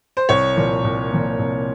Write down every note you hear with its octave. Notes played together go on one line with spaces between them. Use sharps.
C5
C2 C#5
A#2 F3 A#3
C2
A#2 F3 A#3
C2